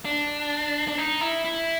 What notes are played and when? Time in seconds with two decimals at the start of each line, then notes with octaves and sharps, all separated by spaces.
0.05 D4
0.88 D4
0.98 D#4
1.21 E4
1.45 E4